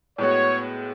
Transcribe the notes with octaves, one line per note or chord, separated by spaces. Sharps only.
A2 G#3 B3 F#4 C#5